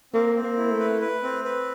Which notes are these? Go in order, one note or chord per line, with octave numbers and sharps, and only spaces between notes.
A#3 C4
C4
A#3
E4
A3
B4
B4
C4
B4